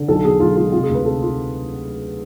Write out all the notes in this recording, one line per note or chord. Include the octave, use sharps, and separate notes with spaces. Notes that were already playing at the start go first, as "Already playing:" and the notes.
Already playing: D3
B1 A4
B2 G#4
B1 F4
G#3 F4
C3 F4
G#4
D2 B4
C3 A4
F4